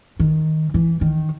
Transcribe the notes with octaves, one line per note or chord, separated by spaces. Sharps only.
D#3
E3
D#3